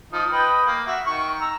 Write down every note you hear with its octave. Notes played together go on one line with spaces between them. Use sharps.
F3 D#4
B4 D#5 G5
A#3
F#4 E5
D#3 C#6
A#5 E6